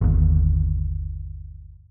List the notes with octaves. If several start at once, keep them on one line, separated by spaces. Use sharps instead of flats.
G1 D#2